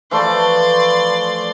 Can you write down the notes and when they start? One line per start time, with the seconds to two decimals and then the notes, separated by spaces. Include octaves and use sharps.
0.11 E3 F3 A3 D5 C6